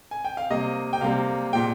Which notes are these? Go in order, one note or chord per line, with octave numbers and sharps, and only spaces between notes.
G#5
G5
F5
C3 G3 A#3 D#5
G5
C3 G3 A#3 F5
A#2 G#3 G5